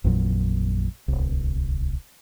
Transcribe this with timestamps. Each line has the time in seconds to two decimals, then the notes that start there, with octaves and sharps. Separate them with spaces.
0.04 A1 F2 A#2 F#3
1.08 D1 C2